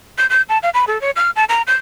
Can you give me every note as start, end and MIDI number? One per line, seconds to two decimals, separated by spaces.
0.18 0.27 91
0.30 0.42 91
0.49 0.58 81
0.63 0.70 77
0.74 0.85 83
0.87 1.00 69
1.01 1.11 73
1.16 1.31 89
1.36 1.44 81
1.49 1.62 82
1.67 1.75 91